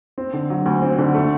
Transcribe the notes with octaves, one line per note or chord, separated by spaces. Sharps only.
C4
D3
F#3
D2
C4
D3
A3